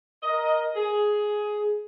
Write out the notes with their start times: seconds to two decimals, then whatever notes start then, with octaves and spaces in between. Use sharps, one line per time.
0.23 A#4 D#5
0.75 G#4